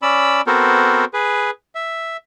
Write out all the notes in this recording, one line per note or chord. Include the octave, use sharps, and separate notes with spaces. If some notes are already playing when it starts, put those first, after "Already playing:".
C#4 D5 B5 E6
B3 C4 F#4 A4 A#4 C5
G#4 B4
E5